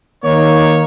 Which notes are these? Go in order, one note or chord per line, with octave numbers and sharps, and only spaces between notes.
D#3 A#3 D#4 C#5